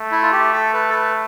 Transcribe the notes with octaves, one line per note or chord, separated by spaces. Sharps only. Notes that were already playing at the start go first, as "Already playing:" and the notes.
Already playing: A3
E4
F4
G4
A4
B4
A4
B4